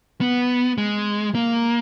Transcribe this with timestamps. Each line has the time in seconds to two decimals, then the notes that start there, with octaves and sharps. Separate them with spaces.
0.21 B3
0.78 G#3
1.35 A#3